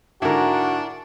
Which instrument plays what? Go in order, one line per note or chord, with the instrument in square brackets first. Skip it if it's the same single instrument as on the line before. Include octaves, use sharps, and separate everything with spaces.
[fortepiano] G#2 D3 [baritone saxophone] D4 [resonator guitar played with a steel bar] E4 A#4 [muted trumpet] F#4